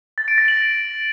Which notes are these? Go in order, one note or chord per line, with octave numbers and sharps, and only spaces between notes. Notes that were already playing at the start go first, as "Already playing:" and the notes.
A6
D7
A#6
F#7